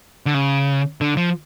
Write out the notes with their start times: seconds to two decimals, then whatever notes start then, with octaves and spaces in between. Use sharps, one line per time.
0.26 D3
0.34 C#3
1.01 D3
1.17 F3